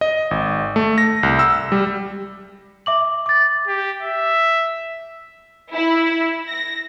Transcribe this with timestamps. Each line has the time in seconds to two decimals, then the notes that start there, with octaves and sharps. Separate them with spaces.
0.01 D#5
0.31 G#1
0.76 A3
0.98 A#6
1.23 C2
1.39 E6
1.72 G3
2.86 E5 D6 F#7
3.26 D6 A6
3.68 G4
4.02 E5
5.73 E4
6.49 A#6